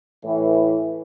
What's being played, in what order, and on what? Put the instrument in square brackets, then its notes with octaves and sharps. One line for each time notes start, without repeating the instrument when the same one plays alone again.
[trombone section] A2 E3